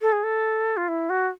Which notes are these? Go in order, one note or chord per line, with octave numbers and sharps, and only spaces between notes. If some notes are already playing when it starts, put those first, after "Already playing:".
A4
G#4
A4
F4
E4
F#4